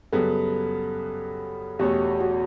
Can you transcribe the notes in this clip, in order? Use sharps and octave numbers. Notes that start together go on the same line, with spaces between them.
F#2 C#3 G3 B3 A4
E2 B2 A3 C#4 G4
F#4